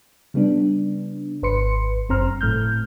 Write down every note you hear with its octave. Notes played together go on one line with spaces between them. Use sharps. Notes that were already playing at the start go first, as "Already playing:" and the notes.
C#3 G3 B3 D4
G#1 B4 C6 C#7
G1 F#2 C4 A#5 C6 F6
A2 A3 F6 G6